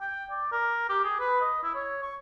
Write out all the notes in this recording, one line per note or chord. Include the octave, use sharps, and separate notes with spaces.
G5
D5
A#4
G4
G#4
B4
D#5
E4
C#5
C#6